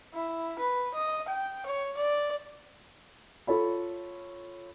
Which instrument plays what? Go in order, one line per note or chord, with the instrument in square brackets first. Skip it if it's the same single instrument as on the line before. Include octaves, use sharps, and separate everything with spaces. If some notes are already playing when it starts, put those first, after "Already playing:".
[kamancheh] E4
B4
D#5
G5
C#5
D5
[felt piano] F4 A4 C#5 B5